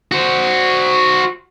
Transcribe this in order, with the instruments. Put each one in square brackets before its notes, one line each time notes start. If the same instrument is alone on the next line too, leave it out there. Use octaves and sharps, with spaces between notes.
[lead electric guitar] F#4 C5